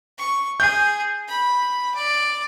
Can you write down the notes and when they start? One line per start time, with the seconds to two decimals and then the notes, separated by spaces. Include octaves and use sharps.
0.18 C#6
0.60 G#4 G6
1.28 B5
1.95 D5